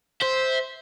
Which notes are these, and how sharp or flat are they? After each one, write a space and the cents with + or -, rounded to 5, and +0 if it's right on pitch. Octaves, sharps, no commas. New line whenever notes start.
C5 +0 E5 -15